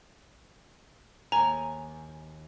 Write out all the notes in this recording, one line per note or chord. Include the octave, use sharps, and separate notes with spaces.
D#2 G#5 A#5